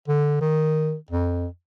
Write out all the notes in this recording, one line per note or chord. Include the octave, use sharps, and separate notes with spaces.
D3
D#3
F2